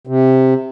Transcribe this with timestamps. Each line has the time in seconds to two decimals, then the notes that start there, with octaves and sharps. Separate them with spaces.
0.07 C3